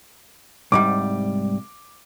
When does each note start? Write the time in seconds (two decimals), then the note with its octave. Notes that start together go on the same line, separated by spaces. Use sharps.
0.72 C2 G#2 G3 D6